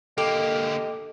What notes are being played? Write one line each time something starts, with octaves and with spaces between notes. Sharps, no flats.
D3 A#3 G4 A4 D#5